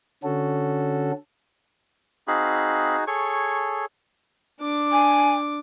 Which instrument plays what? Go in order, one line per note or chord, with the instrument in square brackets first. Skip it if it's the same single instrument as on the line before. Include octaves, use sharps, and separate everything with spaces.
[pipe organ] D3 C#4 F#4 A4
[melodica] C4 F5 B5 [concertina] D#4 F#4 G#4
[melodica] G#4 A4 C#5 [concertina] C#6
[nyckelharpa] D4 D6
[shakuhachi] G#5